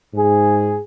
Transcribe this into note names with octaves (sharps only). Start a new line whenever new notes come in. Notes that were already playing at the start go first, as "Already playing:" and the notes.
G#2 G#4